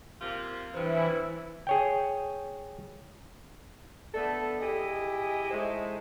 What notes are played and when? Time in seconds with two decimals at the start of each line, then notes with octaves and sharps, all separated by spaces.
0.21 C3 A#3 F4
0.74 G2 C3 E3 E4 B4 C5
1.67 G#4 C#5 G5
4.14 A3 B3 D4 A4
4.60 E4 G4 G#4 D#5
5.51 G#3 A3 D#4 E4 C5